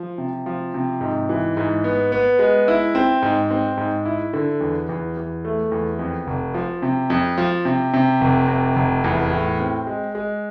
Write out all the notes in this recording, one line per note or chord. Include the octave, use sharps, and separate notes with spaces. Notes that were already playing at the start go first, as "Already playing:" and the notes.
Already playing: F3
C3
F3
C3
G#2
E3
G#2
B3
B3
G#3
E4
C4
G#2
C4
G#2
E4
D3
E2
E2
E2
A3
E2
F2
F1
F3
C3
F2
F3
C3
C3
F1
C3
F1
E2
A2
C4
G#3
G#3